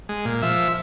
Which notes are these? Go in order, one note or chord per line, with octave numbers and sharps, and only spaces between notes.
G#3
A#2
F3 E5